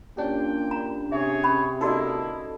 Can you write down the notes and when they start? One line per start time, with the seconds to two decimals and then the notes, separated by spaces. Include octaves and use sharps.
0.17 A#2 C#4 D4 G4 G5
0.71 A#5
1.12 C3 G#4 C#5 E5
1.43 C#4 B5
1.81 A#3 D#4 E4 F#4 A4 D5 D#5